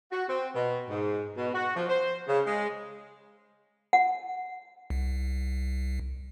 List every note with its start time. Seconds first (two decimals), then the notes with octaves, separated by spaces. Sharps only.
0.11 F#4
0.28 C4
0.54 B2
0.89 G#2
1.37 B2
1.54 F#4
1.75 F3
1.89 C5
2.27 C#3
2.46 G#3
3.93 F#5
4.90 C2